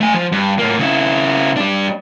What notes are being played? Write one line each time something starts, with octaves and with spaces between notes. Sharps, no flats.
A3 G#5
F3
G2
A2 A#3
C#3 E4
G3 D4